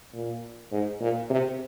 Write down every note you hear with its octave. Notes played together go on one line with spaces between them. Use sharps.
A#2
G#2
A#2
C3